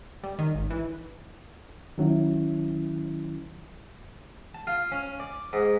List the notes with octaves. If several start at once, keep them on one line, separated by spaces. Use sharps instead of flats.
G3
D#3
G#1
E3
D#3 F#3 C#4 E4
A5
F4
C#4
D5
G#2